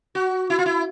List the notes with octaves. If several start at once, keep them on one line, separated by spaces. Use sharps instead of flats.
F#4
E4
F4
E4